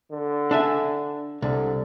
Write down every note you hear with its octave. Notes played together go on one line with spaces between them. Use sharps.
D3
D4 E5 G#5
C2 D3